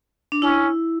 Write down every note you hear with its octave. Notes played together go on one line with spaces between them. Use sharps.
D4
C#4 E4